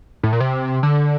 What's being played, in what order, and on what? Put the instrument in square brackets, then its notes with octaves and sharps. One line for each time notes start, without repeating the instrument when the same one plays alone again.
[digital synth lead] A2
A#2
C3
D3